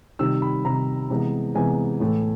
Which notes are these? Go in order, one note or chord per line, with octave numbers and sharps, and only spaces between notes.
C3 D#3 G3 E6
B5
C3 D#3 G3 A#5
C3 E3 G#3 B3
C3 E3 G#3 B3 G#5
A2 E3 A3